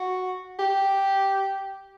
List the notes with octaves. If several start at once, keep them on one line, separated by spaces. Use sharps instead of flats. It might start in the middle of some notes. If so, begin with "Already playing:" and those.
Already playing: F#4
G4